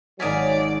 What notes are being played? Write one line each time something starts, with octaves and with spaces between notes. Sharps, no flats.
G#1 F#3 D5 D#5 F5 G#5 D#6 B6